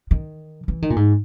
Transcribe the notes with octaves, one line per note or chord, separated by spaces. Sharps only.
D#3
E3
D#3
A#2
G#2